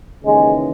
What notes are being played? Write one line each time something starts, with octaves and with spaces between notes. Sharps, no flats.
D#2 C#3 E3 G#3